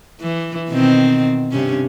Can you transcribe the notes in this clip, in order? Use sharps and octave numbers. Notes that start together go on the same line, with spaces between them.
E3
B2 D#3 C4
G2 C3 C#4